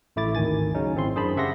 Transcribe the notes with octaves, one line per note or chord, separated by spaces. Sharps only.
A1 A3 E4 D6 A6
G#1 D2 D#3 G#5 A6
C#3 F#3 C#4 D#4
G#1 C4 E4 C6
F#2 D4 G#4 C5 A5 B5
C#3 G4 E5 F#5 C6 A#6